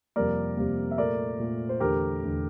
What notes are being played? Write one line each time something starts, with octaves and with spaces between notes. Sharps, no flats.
F2 C3 G3 A#3 A#4 D5
F2 C3 G3 A#3
E5
A#2 A3 A#4 D5
A#2 A3
C5
E2 D3 A3 G4 A#4
E2 D3 A3